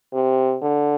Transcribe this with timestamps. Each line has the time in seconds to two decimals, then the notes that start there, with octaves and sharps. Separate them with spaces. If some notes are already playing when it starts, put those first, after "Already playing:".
0.13 C3
0.62 D3